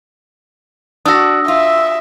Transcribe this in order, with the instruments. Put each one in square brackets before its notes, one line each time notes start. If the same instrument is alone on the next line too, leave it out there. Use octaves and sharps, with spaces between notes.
[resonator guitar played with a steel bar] D4 F#4 [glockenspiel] D#6 E6 A#6
[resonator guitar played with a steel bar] F4 [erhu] E5